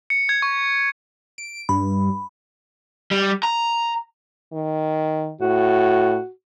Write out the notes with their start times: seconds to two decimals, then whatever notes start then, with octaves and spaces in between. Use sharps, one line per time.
0.10 C#7
0.29 G#6
0.42 C#6
1.38 D7
1.69 G2 B5
3.11 G3
3.43 A#5
4.53 D#3
5.41 A2 F#4